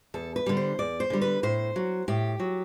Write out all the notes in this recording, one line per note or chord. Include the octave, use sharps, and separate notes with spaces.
E2 A4
B4
D3 G3
C5
E2 D5
C5
D3 G3
B4
A2 C5
F#3
A2 G4
F#3